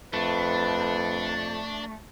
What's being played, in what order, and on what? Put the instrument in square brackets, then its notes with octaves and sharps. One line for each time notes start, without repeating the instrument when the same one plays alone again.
[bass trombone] F2 [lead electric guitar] A3 [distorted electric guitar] D4 [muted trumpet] B4